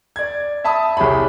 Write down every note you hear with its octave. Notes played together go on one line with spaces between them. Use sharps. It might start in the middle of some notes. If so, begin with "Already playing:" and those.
D5 G#6
E5 A5 B5 D#6
C2 G4 G#4 C#5 B5